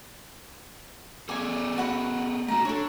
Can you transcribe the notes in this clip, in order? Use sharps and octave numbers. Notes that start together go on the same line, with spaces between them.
B3 G#4 A4 D5 G#5
F#4 F#5 B5
A3 C#4 F#4 A#5
D4 A4 C#5